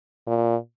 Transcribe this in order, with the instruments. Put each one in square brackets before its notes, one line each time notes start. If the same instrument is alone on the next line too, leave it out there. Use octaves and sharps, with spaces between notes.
[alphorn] A#2